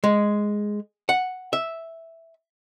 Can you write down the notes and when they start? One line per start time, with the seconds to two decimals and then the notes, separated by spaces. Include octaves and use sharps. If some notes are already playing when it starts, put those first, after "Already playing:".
0.04 G#3
1.09 F#5
1.53 E5